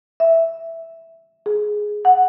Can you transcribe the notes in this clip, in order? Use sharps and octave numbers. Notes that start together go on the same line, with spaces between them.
E5
G#4
F#5